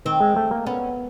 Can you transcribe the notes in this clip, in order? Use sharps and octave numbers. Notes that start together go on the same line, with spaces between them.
D#3 C4
G#3
A3
A#3
B3 C#4